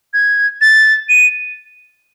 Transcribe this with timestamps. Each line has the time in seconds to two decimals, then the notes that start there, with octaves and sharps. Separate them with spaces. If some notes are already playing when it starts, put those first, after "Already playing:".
0.14 G#6
0.61 A6
1.09 D#7